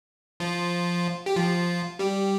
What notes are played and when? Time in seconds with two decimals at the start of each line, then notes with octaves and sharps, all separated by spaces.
0.40 F3 F4
1.26 G4
1.36 F3 F4
1.99 G3 G4